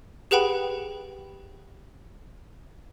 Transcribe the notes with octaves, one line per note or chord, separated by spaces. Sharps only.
G4 G#4 B4 F#5 G5 B5